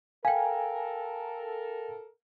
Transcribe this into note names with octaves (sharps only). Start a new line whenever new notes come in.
A4 A#4 F5 G5 G#5